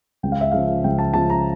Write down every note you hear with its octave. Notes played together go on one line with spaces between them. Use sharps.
C#2 G5
F5
E5
C#3 F3 F5
C#2 G5
A5
C#3 F3 A5
A#5